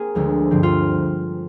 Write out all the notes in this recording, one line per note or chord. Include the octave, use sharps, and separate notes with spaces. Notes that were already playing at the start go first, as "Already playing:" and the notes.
Already playing: A#3 C4 G#4 A#4
D2 D3 F3 G#3
G2 D3 F3 C4
F4